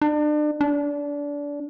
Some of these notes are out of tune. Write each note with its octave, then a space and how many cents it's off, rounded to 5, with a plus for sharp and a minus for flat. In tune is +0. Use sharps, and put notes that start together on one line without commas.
D4 +35
D4 -25